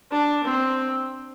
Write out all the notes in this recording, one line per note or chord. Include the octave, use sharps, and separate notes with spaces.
D4
C4